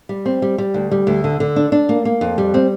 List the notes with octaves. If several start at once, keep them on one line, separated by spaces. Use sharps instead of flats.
G3
C4
G3
G3
D2
G3
D2
D3
D3
D4
D4
A#3
A#3
F2
G3
C4